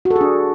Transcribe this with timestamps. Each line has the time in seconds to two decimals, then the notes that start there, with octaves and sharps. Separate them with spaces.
0.05 F#4
0.11 A4
0.16 G#4
0.21 D4